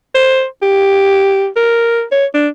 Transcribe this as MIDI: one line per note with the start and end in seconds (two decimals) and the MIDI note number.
0.15 0.45 72
0.62 1.47 67
1.56 2.03 70
2.12 2.26 73
2.34 2.48 62